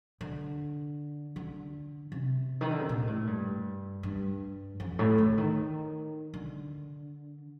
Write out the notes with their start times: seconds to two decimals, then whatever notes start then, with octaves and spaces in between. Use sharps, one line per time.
0.21 D3
1.36 D3
2.12 C3
2.61 D#3
2.71 D3
2.80 C3
2.89 A#2
3.07 A2
3.27 G2
4.03 G2
4.80 F2
4.99 A2
5.18 D3
5.38 D#3
6.34 D3